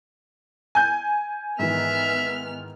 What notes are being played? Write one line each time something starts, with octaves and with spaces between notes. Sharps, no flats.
G#5 G6
G#2 D#3 E3 B3 E5 F6